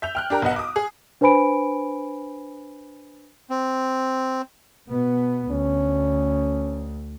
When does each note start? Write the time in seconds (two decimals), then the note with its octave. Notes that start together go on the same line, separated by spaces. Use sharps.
0.02 E5 G6 F7
0.15 G5 F6 F#6
0.30 D4 G4 A#4 A#5
0.42 B1 B3 D#5 F#5
0.56 D6 D#6
0.76 G#4
1.21 D4 B4 C5 G#5 B5 D7
3.50 C4
4.90 B2 B3
5.51 D2 C#4